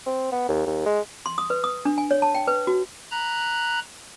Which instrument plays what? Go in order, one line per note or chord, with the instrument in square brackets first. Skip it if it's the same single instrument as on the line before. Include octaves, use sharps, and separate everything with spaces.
[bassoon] C4
B3
D#2
D#2
G#3
[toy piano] C6
D#6
B4
D#6
D4
G#5
C#5
A5
G5
B4
F#4
[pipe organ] A#5 B5 F#6